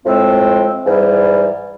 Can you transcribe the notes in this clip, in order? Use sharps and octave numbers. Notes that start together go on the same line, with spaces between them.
A2 F3 G#3 C4
G#2 E3 G3